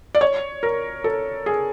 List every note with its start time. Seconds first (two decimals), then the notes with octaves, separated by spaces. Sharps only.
0.15 D5
0.21 C#5
0.63 A#4
1.04 A4
1.46 G#4